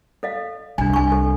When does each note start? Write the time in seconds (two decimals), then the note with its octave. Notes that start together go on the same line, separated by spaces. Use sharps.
0.23 A4 D#5 F5
0.78 C2 D4 G#5
0.94 G#5 C#6
1.12 A4